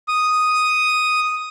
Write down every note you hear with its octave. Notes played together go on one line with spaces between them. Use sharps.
D#6